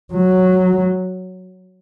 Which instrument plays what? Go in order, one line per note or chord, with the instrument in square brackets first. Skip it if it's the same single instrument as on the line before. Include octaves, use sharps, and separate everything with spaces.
[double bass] F#3